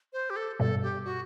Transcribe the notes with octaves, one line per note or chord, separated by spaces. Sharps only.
C5
G4
A4
G2 B2 A4
G4
F#4